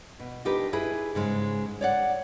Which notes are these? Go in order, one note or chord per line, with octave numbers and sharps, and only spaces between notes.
B2
D4 D#4 F4 G4 A#4 B4
E4 G#4 B4
G#2 C#3 G#3
C#5 D5 F#5